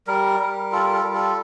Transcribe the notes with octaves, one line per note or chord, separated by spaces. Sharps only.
G3 A#4
G3
F4 A4
A#4
A4
G3 A#4
A4